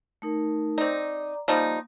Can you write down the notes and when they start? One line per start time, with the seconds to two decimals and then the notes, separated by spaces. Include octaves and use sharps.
0.22 A3 D#4 A#4
0.78 C4 D#4 D5 A#5 D6
1.48 F3 G3 A#3 D#4